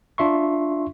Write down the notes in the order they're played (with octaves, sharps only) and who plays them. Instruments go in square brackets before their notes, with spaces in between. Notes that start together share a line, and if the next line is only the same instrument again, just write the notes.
[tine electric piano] D4 F4 E5 C6 C#6